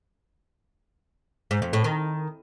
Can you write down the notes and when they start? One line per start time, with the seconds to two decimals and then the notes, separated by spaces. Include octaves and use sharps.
1.51 G#2
1.62 F2
1.73 A2
1.84 D#3